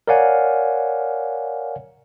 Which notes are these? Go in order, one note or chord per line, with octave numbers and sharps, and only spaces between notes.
A#4 C#5 D5 F5 F#5 G#5